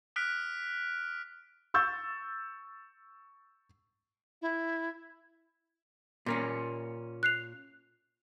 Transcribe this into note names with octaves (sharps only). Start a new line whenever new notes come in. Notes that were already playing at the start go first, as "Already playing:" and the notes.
D#6 F6 F#6 B6 D7
C#6 E6 G6 A6
E4
A#2 A#3 C#4
F#6 C7 F7